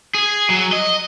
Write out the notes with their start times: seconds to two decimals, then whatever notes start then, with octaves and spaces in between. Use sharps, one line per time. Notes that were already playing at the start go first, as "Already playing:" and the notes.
0.15 G#4
0.50 F#3
0.73 D#5